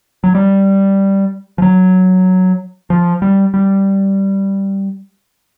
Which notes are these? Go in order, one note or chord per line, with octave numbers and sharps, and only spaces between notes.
F#3
G3
F3
F#3
F3
G3
G3